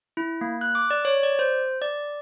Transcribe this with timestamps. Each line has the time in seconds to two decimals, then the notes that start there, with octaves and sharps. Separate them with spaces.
0.17 E4
0.41 A#3
0.61 F#6
0.75 D6
0.91 D5
1.05 C#5
1.23 D5
1.39 C5
1.82 D5